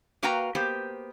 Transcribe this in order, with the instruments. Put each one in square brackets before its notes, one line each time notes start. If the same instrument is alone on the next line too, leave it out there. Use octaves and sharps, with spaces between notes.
[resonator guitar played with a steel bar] A#3 F#4 B4 F5 G5 A#5
A#3 B3 G4 C5